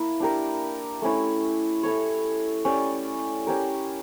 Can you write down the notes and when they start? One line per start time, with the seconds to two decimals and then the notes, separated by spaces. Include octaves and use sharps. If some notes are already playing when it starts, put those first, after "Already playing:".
Already playing: A#3 E4 E5
0.20 D4 G4 A#4
1.02 A3 C#4 E4
1.83 E4 A4 C#5
2.65 C#4 G4 D5
3.47 C#4 G4 A#4